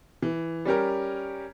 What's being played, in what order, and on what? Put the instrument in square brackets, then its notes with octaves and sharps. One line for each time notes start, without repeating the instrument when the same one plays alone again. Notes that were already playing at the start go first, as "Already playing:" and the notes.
[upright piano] E3
G3 C#4 G4 A#4